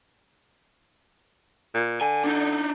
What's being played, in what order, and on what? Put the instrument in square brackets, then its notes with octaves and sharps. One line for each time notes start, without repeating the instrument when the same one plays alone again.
[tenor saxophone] A#2
[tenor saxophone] D3 [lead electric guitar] G#5
[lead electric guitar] D4 D#4